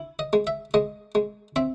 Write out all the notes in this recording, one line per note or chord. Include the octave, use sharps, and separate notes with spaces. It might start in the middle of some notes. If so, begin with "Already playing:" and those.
Already playing: E4
D#5
G#3
E5
G#3 D#5
G#3
C4 E5